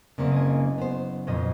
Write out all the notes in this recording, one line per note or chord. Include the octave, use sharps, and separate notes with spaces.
F#1 C#3 A#3 C4
D#5 G#5
B3 C5
F2 A#2 D#5